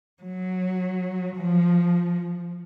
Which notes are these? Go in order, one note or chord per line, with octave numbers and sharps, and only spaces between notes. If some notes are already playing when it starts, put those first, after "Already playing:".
F#3
F3